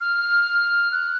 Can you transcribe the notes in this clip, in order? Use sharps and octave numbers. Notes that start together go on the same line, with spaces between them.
F6
F#6